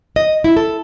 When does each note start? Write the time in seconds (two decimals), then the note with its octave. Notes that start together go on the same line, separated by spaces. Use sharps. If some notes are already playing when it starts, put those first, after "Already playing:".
0.16 D#5
0.44 E4
0.57 A4